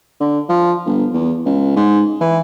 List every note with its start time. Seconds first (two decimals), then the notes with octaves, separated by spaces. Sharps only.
0.20 D3
0.49 F3
0.86 G1
1.13 E2
1.45 C#2
1.76 G#2
2.20 E3